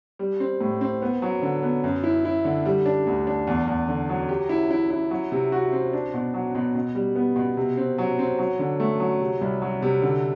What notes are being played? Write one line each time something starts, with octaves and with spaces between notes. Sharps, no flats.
G3
C4
A2
C4
B3
F#3
D3
B3
F#2
E4
E4
D3
G3
D4
D2
D4
E2
E2
D3
F#3
G4
E4
E4
E4
F#3
C3
F#4
C4
D4
B2
F#3
B2
B2
G3
B3
B2
C3
C4
F#3
C4
F#3
D3
A3
F#3
C3
C2
F#3
C3
D3